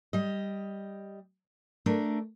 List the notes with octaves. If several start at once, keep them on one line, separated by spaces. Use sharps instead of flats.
G3 D#5
A3 D4 A#4